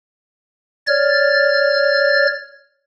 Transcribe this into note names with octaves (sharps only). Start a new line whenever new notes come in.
C#5 D5 F6 A6